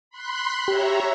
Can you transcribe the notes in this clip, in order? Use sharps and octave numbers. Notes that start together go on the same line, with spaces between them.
B5 C6 F#6
G4 C#5 E5 A#5